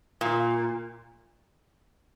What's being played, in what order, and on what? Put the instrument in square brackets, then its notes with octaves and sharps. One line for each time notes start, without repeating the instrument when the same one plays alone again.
[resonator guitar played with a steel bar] A#2